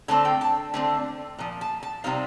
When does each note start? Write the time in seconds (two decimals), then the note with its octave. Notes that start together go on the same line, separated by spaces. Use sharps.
0.08 D3 A3 C4 A5
0.25 G5
0.41 A5
0.74 D3 A3 C4
1.38 A#2 F3
1.61 A5
1.83 A5
2.04 C3 G3 C4 D#4 F5